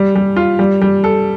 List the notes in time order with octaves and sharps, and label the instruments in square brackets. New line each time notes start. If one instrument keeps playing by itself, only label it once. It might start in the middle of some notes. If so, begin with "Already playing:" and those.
Already playing: [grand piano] G3
G3
F4
G3
G3
A4